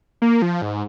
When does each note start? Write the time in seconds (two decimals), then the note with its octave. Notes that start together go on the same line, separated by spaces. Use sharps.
0.22 A#3
0.42 F3
0.62 G#2